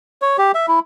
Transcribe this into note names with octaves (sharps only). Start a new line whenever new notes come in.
C#5
G4
E5
E4